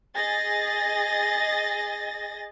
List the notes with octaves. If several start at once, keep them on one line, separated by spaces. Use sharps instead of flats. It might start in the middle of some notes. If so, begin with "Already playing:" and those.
G#4 D#5 A6 A#6